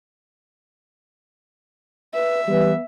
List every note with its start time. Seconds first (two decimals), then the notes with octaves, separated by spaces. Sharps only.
2.14 B4 E5
2.47 E3 G3 B3